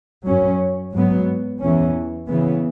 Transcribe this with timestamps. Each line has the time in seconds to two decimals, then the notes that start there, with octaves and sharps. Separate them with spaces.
0.27 F#2 F#3 C#4
0.93 G#2 F#3 B3
1.61 E2 E3 C#4
2.28 C#3 E3 B3